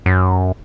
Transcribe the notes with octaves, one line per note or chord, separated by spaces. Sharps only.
F#2